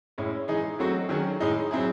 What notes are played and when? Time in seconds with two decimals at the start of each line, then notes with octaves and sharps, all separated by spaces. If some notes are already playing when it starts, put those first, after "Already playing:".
0.18 A2 G#3 C#4 E4
0.48 E3 G#3 D#4 G#4
0.79 F#3 A3 C4 F#4
1.09 D#3 F#3 C#4 G#4
1.40 A2 G#3 D#4 G#4
1.71 F#3 C4 E4 G#4